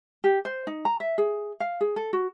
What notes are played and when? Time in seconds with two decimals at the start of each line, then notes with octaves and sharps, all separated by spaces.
0.24 G4
0.45 C5
0.67 D#4
0.85 A#5
1.00 E5
1.18 G#4
1.60 F5
1.81 G#4
1.96 A4
2.13 F#4